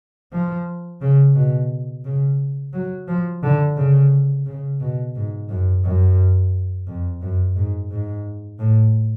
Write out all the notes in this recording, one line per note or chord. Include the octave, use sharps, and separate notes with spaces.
F3
C#3
B2
C#3
F#3
F3
D3
C#3
C#3
B2
G#2
F#2
F#2
F2
F#2
G#2
G#2
A2